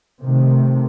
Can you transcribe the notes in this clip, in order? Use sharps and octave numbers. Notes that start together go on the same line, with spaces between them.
C3 D#3 A3